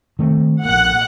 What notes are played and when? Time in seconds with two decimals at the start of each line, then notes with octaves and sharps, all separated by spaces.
0.19 D#3 A3 C4
0.65 A#1 A#3 F#5